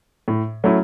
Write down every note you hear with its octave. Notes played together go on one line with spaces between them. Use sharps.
A2
F#3 A3 C#4 E4